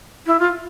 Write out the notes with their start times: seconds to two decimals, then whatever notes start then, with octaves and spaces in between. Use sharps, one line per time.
0.27 E4
0.39 F4